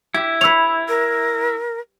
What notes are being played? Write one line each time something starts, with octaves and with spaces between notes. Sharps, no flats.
E4 G4
B4 C#5 E6 F7
A#4